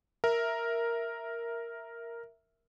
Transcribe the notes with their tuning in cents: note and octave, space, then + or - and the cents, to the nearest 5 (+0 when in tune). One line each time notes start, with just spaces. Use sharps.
A#4 +0 E5 +0